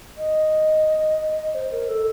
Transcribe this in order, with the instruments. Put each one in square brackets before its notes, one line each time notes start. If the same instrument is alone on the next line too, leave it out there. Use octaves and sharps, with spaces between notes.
[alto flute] D#5
C5
A#4
A4